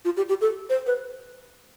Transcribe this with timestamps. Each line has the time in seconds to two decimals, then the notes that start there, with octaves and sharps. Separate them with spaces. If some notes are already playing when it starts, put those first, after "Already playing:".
0.05 F4
0.17 G4
0.29 G4
0.41 A4
0.70 C5
0.86 B4